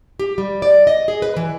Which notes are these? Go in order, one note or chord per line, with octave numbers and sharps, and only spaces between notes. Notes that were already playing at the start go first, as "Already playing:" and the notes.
G4
G3
D5
D#5
G#4
B4
E3